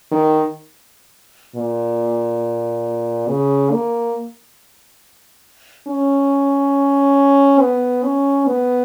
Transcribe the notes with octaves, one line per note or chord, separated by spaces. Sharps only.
D#3
A#2
C#3
A#3
C#4
B3
C#4
B3